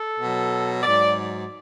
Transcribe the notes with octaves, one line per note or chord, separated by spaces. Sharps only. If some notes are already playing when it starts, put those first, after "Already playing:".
Already playing: A4
B2 F#3
G#2 F#3 D5